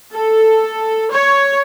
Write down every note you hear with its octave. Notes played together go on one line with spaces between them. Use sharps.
A4
C#5